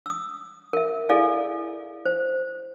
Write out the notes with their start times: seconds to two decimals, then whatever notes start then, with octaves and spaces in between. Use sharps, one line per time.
0.06 D#6 E6
0.73 A#4 E5
1.09 E4 G#4 A4 D5 F5 G#5
2.05 C5